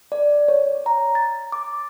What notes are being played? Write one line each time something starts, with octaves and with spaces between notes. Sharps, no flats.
D5
C#5
A#5
A6
D6